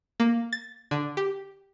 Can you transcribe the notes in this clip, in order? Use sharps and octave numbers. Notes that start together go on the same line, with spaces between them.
A#3
A6
D3
G4